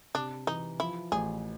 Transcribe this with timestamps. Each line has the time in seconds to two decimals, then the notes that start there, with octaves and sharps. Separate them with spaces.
0.14 C3 D4
0.47 E3 D#4
0.79 F3 E4
1.12 A1 G#4